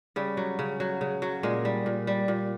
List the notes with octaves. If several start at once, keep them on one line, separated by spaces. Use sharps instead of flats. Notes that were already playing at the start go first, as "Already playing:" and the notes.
C#3 G3
F#3
C#3
F#3
C#3
F#3
A#2 G#3
G3
A#2
G3
A#2